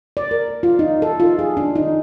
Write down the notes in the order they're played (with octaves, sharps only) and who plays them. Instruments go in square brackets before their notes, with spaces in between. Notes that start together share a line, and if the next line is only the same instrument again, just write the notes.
[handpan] D5
A#4
F4
D#4
A4
F4
G#4
D4
D#4